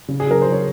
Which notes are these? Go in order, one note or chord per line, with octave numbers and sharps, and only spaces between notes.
C#3
G#4
F#3 A#4
F#3 C5
C#5